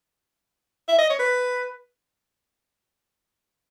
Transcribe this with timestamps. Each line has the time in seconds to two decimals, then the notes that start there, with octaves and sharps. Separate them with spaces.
0.88 E5
0.99 D#5
1.10 C#5
1.19 B4